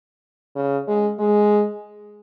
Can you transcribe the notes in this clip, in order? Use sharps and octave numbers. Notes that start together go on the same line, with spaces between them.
C#3
G#3
G#3